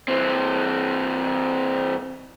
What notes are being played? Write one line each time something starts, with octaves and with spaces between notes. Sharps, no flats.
E3 C4